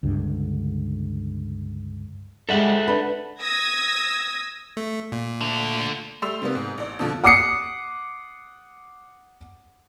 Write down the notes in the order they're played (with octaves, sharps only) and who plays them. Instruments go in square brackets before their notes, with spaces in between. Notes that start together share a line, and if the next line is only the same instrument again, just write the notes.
[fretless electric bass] C#2 G2 D3
[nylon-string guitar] G3 G#3 [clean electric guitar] A4 E5 F#5
[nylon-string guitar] D4 B4
[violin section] D#6 E6 G#6 A#6
[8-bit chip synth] A3
A#2
[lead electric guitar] D3 A3
[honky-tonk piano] G3 A3 C6 E6 F7
C3 G3 A#3 B3
G#2
A1 D5
F2 B2 D3 F3
[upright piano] F#5 D6 D#6 C7 C#7